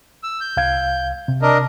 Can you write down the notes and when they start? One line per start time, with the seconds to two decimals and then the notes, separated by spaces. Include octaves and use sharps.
0.23 E6
0.41 G6
0.57 C2 F5 G#6
1.28 C3
1.42 D4 A#4 D#5